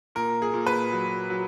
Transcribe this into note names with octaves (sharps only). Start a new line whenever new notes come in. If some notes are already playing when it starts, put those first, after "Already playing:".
A#2 A#4
G#4
A#2
B4
F#3
F#3